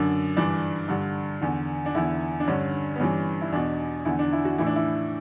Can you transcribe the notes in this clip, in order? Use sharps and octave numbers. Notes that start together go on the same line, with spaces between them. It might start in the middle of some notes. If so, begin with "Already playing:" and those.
Already playing: F#2 D3 D4
G2 E3 D4
G2 D3
E2 D3
D4
E2 D3 E4
D4
G2 D3 C#4
B3
G2 E3 C#4
E4
E2 B2 D4
E2 D3 E4
D4
E4
F#4
A2 E3 E4
D4
E4